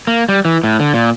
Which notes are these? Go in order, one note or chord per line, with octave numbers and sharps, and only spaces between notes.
A#3
G3
E3
A2
D3
A#2